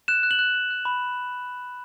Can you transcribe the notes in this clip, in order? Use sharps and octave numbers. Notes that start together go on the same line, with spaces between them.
F#6 E7
F#6
F#7
F#6
F#6
F#6
B5